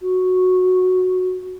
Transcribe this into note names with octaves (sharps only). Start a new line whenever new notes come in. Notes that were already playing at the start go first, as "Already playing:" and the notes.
F#4